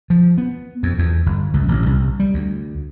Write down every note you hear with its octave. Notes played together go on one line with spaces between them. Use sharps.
F3
B3
F2
E2
G1
C#2
A1
C2
G3
D2